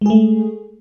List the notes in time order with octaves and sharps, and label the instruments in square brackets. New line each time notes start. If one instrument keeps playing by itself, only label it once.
[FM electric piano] G#3
G#4
A3